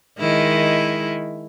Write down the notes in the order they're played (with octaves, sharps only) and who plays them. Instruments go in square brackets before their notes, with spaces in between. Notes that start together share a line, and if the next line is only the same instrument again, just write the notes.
[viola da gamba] D#3 G#3 E4